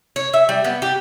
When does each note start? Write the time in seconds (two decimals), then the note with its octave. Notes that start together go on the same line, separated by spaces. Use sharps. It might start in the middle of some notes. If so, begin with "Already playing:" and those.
0.16 C#5
0.33 E5
0.49 G3
0.64 B3
0.82 G4